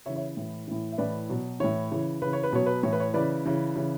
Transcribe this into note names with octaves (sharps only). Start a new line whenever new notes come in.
C#3 E3 C#5 E5
C#5 E5
A2 E3
A2 E3
E5
A2 E3 B4 D5
B2 F#3
A2 E3 C#5
C#3 E3
C#3 E3 B4
C#5
B4
B2 F#3 C#5
B4
A2 E3 C#5
B4
C#5
C#3 E3 B4 D5
C#3 E3
C#3 E3